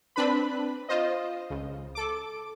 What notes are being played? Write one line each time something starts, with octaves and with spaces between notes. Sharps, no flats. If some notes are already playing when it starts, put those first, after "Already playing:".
C4 D4 B4 B5
F4 C5 D#5
C#2
A4 D6